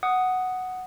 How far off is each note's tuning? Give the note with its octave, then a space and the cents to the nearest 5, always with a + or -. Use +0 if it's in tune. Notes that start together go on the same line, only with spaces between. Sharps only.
F#5 +0 D#6 +0